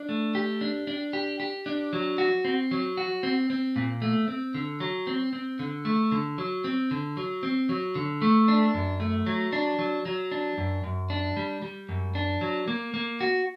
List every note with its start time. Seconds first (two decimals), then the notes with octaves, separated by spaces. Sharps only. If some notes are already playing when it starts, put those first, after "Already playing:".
Already playing: D4
0.09 A3
0.35 G4
0.61 D4
0.87 D4
1.13 G4
1.40 G4
1.66 D4
1.93 F#3
2.18 F#4
2.45 C4
2.71 F#3
2.97 F#4
3.23 C4
3.50 C4
3.76 A#2
4.02 A3
4.28 C4
4.54 D3
4.80 F#3
5.07 C4
5.33 C4
5.59 D3
5.85 A3
6.12 D3
6.38 F#3
6.64 C4
6.91 D3
7.17 F#3
7.43 C4
7.69 F#3
7.95 D3
8.22 A3
8.48 D4
8.74 F#2
9.00 A3
9.26 F#3
9.53 D4
9.79 F#3
10.05 F#3
10.32 D4
10.58 F#2
10.84 F#2
11.10 D4
11.37 G3
11.62 G3
11.89 F#2
12.15 D4
12.41 F#3
12.68 A#3
12.94 A#3
13.21 F#4